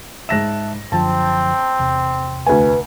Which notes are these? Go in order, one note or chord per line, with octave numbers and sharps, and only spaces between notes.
G#2 E5 A5 F#6 A#6 E7
F#2 D3 F3 C4 A5
E2 C3
D2 B4 G#5